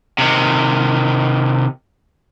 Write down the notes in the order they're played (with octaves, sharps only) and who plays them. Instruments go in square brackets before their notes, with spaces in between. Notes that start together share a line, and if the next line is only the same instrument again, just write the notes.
[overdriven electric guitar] C3 D#3